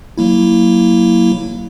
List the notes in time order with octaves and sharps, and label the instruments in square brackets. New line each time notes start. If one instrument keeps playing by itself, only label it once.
[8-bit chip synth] F#3 A#3 E4